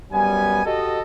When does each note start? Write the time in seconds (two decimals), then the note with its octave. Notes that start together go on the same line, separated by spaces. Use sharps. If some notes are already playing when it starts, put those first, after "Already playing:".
0.13 F#2 G3 B3 G#5
0.66 F#4 G4 A4 D#5